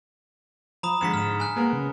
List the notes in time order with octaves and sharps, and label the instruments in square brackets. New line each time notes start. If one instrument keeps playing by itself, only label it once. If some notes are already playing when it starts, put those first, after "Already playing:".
[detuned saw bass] F3 [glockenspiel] A#5 B5 D#6
[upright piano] F2 D3 G#3 [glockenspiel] B6 C#7 E7
[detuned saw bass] G#2 [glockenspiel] F6 E7
[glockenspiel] G#5 F#6
[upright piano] G#3 B3 A#4 [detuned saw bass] A#3
[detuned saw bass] C#3